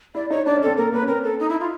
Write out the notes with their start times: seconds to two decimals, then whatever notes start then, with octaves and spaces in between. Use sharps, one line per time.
0.15 E4 D5
0.30 D#4 C#5
0.46 D4 D5
0.56 C#4
0.62 C4 A4
0.76 A#3 A#4
0.92 A#3 B4
1.02 C#4
1.08 C4 A#4
1.24 A4
1.39 D#4
1.49 E4
1.60 F4